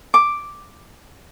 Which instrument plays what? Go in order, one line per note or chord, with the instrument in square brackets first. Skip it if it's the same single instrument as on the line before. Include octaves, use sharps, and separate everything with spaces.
[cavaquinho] D6